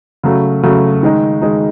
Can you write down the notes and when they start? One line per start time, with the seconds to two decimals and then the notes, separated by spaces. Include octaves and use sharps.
0.23 C#3 F#3 A3
0.63 C#3 F#3 A3
1.03 D#3 G#3 D#4
1.42 D#3 G#3 D#4